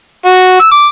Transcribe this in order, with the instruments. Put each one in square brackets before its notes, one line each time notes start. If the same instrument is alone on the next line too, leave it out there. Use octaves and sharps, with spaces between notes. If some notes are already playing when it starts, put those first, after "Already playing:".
[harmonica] F#4
E6
D6